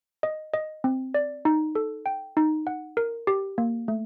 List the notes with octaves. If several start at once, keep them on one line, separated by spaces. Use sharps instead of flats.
D#5
D#5
C4
D5
D#4
A4
G5
D#4
F#5
A#4
G4
A#3
A3